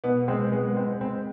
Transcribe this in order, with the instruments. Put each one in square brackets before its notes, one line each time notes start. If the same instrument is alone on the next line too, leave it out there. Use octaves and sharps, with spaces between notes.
[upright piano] B2 B3
G#3 C4
G#3 B3
B3
G#3 C4
G#3 C4